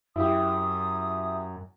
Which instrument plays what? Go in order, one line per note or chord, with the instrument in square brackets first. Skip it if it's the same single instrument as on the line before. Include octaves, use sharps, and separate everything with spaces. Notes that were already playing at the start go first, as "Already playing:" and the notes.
[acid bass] F#2 [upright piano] E4 G4 [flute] D#6